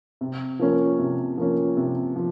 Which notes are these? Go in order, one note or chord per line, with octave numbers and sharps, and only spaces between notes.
C3
F3 A#3 C#4
C3
F3 A#3 C#4
C3
F3